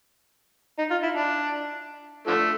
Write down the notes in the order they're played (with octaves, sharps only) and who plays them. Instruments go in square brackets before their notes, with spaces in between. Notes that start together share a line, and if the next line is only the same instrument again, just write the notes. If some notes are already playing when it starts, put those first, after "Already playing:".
[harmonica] D#4
F4
E4
D4
D3 F3 A3